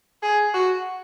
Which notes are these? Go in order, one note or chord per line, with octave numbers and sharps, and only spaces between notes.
G#4
F#4